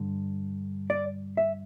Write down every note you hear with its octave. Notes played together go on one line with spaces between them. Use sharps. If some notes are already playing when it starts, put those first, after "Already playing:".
Already playing: G2 D3
D5
E5